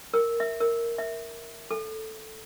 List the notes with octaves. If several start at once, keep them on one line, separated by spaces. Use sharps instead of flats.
A#4
E5
A#4
E5
A4